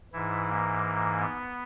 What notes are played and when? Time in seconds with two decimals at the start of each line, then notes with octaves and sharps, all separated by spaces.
0.13 G#2 E3 E4
0.48 A#3
1.18 B3